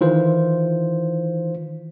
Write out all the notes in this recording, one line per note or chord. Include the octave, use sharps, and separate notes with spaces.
D#3 E3 F4 C5